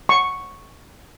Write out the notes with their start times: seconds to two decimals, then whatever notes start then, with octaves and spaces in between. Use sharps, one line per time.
0.09 C#6